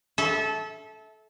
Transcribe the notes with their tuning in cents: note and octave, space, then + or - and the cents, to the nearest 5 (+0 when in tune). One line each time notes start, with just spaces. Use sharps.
A4 -20 E5 -25